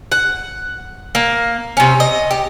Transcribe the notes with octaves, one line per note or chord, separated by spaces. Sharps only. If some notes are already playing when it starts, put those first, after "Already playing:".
F#5
A#3
C3 C#4
D#5
G4